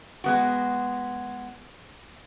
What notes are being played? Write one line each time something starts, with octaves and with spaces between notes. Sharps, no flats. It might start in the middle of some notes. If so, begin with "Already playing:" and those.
G#3 B3 F#4